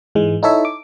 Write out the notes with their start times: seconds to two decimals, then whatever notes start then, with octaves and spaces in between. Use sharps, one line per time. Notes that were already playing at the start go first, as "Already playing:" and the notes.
0.15 G#2 E3 G#3
0.43 D#4 E4 A4 C#5 E5
0.65 D6